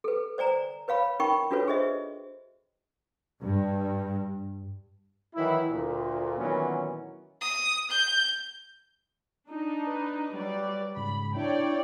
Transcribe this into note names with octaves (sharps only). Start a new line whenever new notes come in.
A4 B4
C5 D5 G#5 A#5
B4 C#5 F5 B5
D#4 A#4 G5 B5 C#6
D4 F4 F#4 A4 B4 C#5
G#4 C5 D#5 E5
G2
D#3 E3 F#3 E4
D2 A#2
A#2 D#3 E3 F#3 B3 C#4
D#6
G6
D4 D#4
B4
F#3 G3 D5
G#2 C#3 B5
D4 E4 C#5 D5 G5